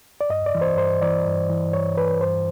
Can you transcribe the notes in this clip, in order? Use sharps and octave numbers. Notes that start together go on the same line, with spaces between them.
D5
G2 D#5
D5
E3
C5
G2 C5
E3 D5
G2
E3
G2 C#5
E3 B4
G2 C5